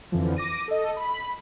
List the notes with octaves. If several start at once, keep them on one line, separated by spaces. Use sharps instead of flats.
F2 D3 E3 F3
D6 A#6 D#7
A4 D#5
B5